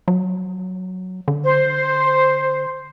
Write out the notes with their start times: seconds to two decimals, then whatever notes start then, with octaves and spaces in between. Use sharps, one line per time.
0.08 F#3
1.28 D3
1.42 C5